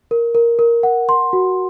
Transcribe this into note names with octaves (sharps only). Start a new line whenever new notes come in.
A#4
A#4
A#4
F#5
C6
F#4